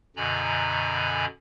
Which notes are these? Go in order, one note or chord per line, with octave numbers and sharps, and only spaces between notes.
F#2 B2 D3 G#5 A#5 B5